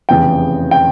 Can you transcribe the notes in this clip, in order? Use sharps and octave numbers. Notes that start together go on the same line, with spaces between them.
F1 E2 C#3 G5
G5